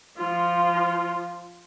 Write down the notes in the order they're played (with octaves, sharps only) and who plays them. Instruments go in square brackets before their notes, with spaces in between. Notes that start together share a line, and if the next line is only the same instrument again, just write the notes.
[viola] F3 F4